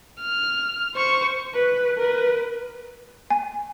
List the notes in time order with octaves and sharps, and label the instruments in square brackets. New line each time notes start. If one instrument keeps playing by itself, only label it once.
[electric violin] F6
C5 C#6
[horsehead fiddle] B4
A#4 B4
[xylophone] G#5